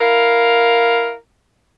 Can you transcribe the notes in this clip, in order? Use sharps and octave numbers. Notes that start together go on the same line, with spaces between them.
E4 A#4 F5